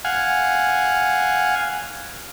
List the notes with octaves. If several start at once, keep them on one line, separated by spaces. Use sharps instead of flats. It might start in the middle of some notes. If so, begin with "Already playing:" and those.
F5 F#5 G#5